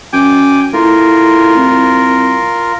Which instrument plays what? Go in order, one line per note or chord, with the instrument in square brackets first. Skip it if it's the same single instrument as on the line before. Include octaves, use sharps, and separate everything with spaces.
[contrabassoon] F#2 [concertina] G5 G#5 D6
[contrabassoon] A2 [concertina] F4 A#4
[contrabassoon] C2